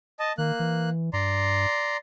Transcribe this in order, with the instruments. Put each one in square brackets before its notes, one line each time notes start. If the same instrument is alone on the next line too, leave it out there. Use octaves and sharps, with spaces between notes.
[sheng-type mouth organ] D#5 A5
[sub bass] D#3 [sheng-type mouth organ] A#3 F#6
[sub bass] E3
[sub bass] G2 [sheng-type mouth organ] D5 A#5 C6